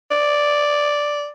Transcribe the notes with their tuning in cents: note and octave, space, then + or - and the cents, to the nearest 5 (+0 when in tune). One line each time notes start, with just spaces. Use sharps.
D5 +0